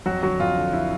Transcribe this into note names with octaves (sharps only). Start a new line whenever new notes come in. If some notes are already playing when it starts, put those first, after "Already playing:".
F2 F#3 F#4
D3 F#3 F#4
F2 F4
D3
E4